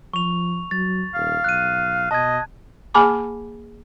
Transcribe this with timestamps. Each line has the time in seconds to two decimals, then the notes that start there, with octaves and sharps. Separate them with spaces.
0.14 F3 C#6 F7
0.71 F#3 A6
1.14 D#1 F5
1.44 B1 F#6 D#7
2.11 B2 D#5 A5 G#6
2.94 A#3 G#4 G#5 A5 B5 D6